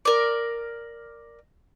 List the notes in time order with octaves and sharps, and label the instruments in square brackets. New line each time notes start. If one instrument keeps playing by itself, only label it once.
[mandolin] A#4 D5